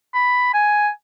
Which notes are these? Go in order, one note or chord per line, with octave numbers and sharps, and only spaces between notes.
B5
G#5